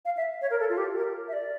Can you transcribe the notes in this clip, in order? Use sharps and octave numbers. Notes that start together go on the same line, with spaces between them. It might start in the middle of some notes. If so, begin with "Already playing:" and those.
F5
E5
C#5
A#4
A4
F4
G4
A#4
E5
D5